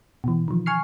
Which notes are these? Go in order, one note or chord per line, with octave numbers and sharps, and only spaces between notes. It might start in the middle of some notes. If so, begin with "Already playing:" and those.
B2 E3
D#3 F3
G#5 C#6 F6 C7